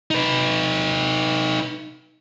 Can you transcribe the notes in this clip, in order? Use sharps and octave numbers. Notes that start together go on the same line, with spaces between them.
D#4 B4